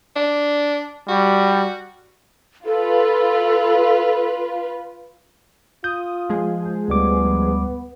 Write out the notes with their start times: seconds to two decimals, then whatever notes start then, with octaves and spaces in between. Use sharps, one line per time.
0.16 D4
1.09 G3 F#4
2.66 F4 A4 B4
5.84 F4 D#6 G6
6.29 F3 G#3 G#4
6.88 D2 G3 B3 D6